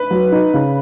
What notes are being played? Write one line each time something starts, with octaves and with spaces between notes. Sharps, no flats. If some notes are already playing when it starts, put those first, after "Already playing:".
Already playing: B4
F#3
D#4
C#3